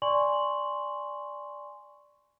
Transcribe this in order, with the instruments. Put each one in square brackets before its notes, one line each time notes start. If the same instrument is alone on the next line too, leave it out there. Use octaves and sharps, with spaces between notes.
[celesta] D5 G#5 C6 C#6 F#7